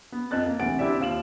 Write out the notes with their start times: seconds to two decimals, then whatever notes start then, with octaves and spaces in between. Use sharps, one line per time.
0.12 B3
0.31 F2 D#5 F#6 A6
0.46 A#3
0.60 D2 C3 E3 F#5 A6 D7
0.79 C4 D4 E4 G4 D5 E5
1.00 D#2 F4 E7 F#7